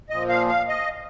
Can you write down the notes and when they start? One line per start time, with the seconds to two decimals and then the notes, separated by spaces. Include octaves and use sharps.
0.10 A#2 F3 D#5
0.29 F5
0.49 F5
0.69 D#5